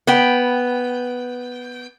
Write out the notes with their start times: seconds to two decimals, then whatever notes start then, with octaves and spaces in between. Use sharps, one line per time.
0.07 B3 G5